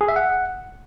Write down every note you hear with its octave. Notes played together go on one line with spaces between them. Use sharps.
G#4
E5
F#5